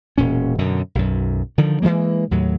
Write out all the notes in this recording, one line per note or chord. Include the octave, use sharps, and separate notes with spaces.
E1 A#2 C#4
F#2 B2 D3
B1 F#2
D3 D#3 F3
E3 F#3 G#3 A#3
D#2 A2 F#3